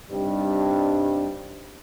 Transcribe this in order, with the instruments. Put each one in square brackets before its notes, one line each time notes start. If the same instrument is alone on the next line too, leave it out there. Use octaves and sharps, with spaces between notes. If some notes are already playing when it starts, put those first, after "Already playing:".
[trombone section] G2 C3 G3 D4 D#4